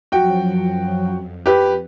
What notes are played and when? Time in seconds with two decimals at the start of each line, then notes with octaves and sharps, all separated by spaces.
0.12 F#2 F3 F#3 F#4 G5
1.11 F2
1.46 G4 B4